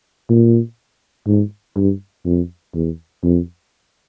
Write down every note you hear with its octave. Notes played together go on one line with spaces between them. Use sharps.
A#2
G#2
G2
F2
E2
F2